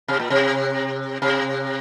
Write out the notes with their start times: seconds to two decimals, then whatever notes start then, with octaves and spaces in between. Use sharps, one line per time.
0.08 C3
0.20 A#2
0.30 C3
1.22 C3